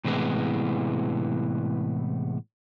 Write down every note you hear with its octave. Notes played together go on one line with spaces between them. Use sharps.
A2 C3 E3 G#3 B3